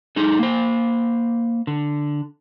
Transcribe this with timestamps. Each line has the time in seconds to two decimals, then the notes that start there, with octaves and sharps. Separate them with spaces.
0.16 D#4 G#4 A4
0.39 A#3 C5
1.67 D3